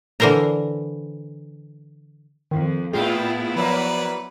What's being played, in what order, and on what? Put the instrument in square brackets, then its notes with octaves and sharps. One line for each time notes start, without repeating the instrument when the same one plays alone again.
[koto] D3 E3 A#4 C5 A#5
[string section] F2 [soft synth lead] D#3
[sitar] A2 F4 [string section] B3 E4 [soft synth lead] G#4 [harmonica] G5
[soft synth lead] F3 [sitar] F#3 A#3 [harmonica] B4 D5